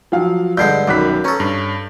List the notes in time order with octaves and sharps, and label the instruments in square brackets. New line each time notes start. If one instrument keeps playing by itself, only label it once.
[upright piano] F3 F#3 F5
[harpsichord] G2 D3 G#3 [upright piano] G6 C7
[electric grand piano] B1 D#3 B5 [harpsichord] F#2 [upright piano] D6 F#6 B6
[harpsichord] C#4 A4 [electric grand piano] B4 A#5 C#6
[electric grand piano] G2